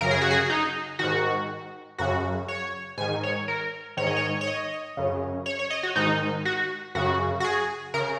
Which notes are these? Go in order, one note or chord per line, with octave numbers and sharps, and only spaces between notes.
F#2 C#3 A#4
G#4
F#4
G#4
D#4
G#2 D#3 F#4
F#2 C#3 F#4
C#5
G#2 D#3 G#5
C#5
A#4
G#2 D#3 C#5
D#5
C#5
C#5
D#5
F#2 C#3
C#5
C#5
D#5
F#4
G#2 D#3 D#4
F#4
F#2 C#3 F#4
F#4
G#4
C#3 A#4